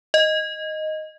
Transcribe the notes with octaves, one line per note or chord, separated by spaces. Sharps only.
D#5